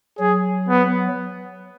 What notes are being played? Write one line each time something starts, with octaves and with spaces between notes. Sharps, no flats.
F#3 G#4
B3